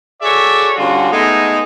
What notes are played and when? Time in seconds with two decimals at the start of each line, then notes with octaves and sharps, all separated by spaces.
0.22 F#4 G#4 A4 C#5 D5 E5
0.76 D3 G3 C#4 F4 F#4
1.11 G#3 A3 B3 D#4